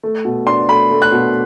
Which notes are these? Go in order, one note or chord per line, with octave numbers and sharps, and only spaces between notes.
A3
B2
D4 C6
A3 B5
A3
F#6
B2